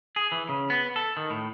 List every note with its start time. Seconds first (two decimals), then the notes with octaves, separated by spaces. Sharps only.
0.16 G#4
0.32 E3
0.49 C#3
0.70 B3
0.96 A4
1.17 D#3
1.30 A2